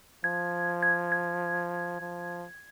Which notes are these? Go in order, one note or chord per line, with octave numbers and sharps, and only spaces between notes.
F3 G#6
G#6
G#6
F3